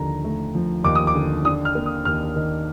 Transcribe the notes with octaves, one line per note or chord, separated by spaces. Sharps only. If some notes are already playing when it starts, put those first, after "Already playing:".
Already playing: D#2 D3 F3 A#5
A3
F3
D#2 D6
D#6
D6
D3
D4 D#6
F6
A#3
D#6
D#2 F6
D#3